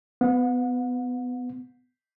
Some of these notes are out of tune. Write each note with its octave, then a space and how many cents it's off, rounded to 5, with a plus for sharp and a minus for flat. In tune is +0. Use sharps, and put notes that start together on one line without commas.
B3 +20 F#5 -40